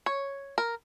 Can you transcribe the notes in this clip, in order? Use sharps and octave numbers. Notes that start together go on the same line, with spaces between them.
C#5
A#4